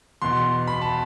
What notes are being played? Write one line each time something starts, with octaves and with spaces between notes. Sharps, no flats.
E2 B2 C6
B5
A5